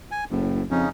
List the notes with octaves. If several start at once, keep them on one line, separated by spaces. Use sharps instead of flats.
G#5
F#1 A2
F2 C#3 C#4 D#4